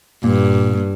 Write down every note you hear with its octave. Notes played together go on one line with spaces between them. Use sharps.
G2 A#2